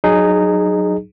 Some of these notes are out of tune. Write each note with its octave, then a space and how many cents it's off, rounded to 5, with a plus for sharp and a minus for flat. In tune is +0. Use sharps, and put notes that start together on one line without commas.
F#3 +0 D#4 -20 G#4 +0